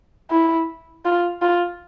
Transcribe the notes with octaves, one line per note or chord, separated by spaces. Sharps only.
E4
F4
F4